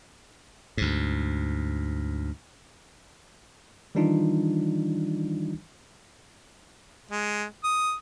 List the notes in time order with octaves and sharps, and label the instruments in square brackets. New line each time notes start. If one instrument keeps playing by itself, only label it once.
[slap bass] D2 G#2
[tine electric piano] D#3 E3 G3 D4 D#4 F4
[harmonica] G#3
D#6